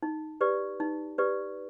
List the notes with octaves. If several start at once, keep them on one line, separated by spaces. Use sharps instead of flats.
D#4
G4 B4 D5
D#4
G4 B4 D5